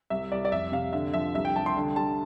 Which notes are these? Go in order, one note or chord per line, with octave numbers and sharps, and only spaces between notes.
C2 E5
C2 D5
D5
F1 E5
C3 F5
D3 E5
F3 E5
C2 E5
G5
C2 A5
C6
D3
G3 A5